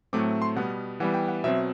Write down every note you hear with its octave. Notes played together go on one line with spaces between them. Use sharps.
A2 F#3 A3 C4 D6
C6
B2 G3 B3 F#5
E3 G3 B3 F#5
G5
F#5
B2 F#3 C4 E5